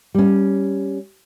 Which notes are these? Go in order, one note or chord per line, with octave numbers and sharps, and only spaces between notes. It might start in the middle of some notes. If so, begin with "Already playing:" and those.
G3 C#4